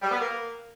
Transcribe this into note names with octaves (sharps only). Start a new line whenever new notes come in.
G3
B3
A#3